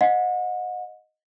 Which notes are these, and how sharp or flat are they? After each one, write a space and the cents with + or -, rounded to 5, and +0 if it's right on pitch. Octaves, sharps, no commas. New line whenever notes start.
D#5 +0 F#5 -35